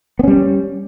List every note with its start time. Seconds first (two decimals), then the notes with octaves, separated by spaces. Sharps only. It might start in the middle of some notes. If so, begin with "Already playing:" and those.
0.19 B3
0.23 C#4
0.28 G3